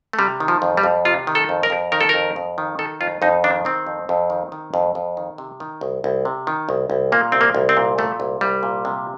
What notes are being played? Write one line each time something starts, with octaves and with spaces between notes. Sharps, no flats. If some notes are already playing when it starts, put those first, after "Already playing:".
A3
C3 G3
D#3
F3
F2
G3
F2
C3 F4
D#3
A4
F2
A#4
F2
D#3 A#4
A4
F2 A#4
F2
D#3
D#3 A4
F2 F4
F2 D#4
D#3 D4
D#3 C4
F2
F2
D#3
D#3
F2
F2
D#3
C3
D#3
C2
C2
C3
D#3
C2
C2
A#2 A#3
C2 C4
A#3
C2
C4
A#2
A#2 A3
C2
C2 G3
A#2
C3